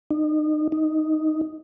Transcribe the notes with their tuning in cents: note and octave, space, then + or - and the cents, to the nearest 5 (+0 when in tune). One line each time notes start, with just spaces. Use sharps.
D#4 -30
D#4 +0